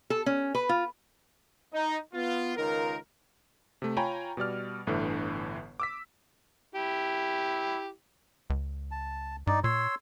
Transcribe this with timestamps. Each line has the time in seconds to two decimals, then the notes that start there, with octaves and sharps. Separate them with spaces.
0.10 A4
0.26 C#4
0.55 B4
0.69 F4
1.73 D#4
2.13 B3 F4
2.57 C#2 D#3 D#4 F4 A#4
3.82 C3 A3
3.97 F4 C#5 G5 G#5 A#5 B5
4.37 B2 G3 D5 F6
4.87 G1 A2 D3 E3
5.80 D6 E6 B6
6.75 E4 G4
8.50 C#2
8.91 A5
9.47 G2 D#4 D5
9.64 A#2 C#5 C6 E6